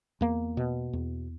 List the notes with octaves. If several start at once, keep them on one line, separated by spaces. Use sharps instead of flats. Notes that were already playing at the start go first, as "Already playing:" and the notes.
E2 A#3
B2
E2